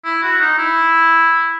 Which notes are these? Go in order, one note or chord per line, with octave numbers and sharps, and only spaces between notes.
E4
F#4
D#4
E4